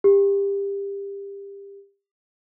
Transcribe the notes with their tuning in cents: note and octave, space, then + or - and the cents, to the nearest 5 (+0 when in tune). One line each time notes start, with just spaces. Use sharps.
G4 +25